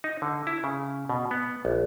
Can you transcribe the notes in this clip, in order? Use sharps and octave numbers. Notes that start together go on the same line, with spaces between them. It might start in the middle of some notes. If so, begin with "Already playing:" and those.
D#4
D3
E4
C#3
B2
B3
A#1